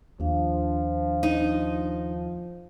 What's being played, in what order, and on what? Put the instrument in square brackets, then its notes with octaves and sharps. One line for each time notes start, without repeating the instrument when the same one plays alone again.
[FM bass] D#2 [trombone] F3 [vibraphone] D4 F5
[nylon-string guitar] D#4